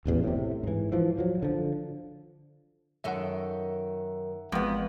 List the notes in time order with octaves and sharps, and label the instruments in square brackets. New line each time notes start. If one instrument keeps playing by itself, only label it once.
[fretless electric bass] E1 A1 E2
A2 C3
G#2 E3
E3 F3
F3 F#3
D3 F3
[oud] F#2 D#3 A4 [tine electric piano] E5 F#5
[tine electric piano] G#1 G#3 [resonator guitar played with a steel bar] F2 B3